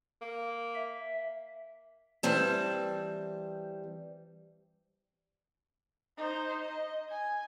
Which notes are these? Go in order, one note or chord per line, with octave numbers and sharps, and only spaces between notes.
A#3
E5
E3 G3 C4 A5
D#4 C5
D#5
G#5